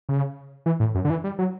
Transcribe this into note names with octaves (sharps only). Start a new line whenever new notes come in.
C#3
E3
A2
F#2
D3
E3
G3
F#3